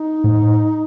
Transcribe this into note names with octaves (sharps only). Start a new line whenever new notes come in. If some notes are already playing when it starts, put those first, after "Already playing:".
Already playing: D#4
A2